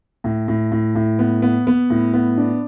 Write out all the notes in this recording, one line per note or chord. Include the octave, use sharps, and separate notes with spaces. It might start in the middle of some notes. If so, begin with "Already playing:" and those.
A2
A2
A2
A2
B3
B3
B3
A2
B3
D4